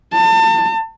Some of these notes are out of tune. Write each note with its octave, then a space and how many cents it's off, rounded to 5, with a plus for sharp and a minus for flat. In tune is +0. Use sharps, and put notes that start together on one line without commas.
A5 +35